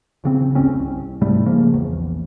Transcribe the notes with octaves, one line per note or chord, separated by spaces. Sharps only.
A#1 C#3 C4
G1 D2 C4 C#4
C2
G#2 C3 G3 A3
C#3 F3 A#3
A#1 E2